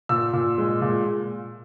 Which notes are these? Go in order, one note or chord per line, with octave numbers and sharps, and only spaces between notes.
A#2 E6
A#2
G#3
A#2